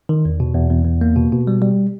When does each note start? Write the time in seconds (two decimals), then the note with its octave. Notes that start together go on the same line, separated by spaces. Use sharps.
0.09 D#3
0.25 E2
0.40 B2
0.55 E2
0.70 E2
0.85 E2
1.01 A#3
1.16 B2
1.32 B2
1.47 G3
1.62 G3